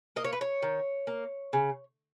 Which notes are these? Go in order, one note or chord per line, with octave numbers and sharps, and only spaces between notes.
A#3 D#5
C#5
B4
C#5
D#3
A#3
C#3